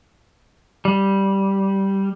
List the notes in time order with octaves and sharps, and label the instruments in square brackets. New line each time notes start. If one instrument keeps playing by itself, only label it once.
[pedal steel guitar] G3